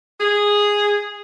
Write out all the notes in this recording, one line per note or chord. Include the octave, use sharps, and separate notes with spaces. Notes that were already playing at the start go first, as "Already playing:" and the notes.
G#4